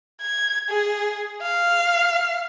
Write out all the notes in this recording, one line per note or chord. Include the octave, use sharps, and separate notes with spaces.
G#6
G#4
F5